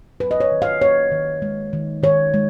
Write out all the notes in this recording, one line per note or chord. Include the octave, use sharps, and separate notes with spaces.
F#3 B4
D#5
C#5
D#3
F5
A#3 C#5
D#3
G#3
D#3
D#3 C#5
G#3